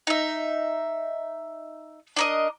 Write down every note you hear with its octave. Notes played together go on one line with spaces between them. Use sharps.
D#4 E5
D4 A#4 D#5